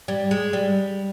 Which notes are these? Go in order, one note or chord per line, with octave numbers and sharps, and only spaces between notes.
G3
G#3
G3